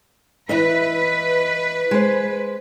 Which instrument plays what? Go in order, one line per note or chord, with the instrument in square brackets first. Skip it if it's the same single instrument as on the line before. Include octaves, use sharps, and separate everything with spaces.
[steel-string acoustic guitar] E3 D#5 E5 [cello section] B4
[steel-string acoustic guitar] G#3 C5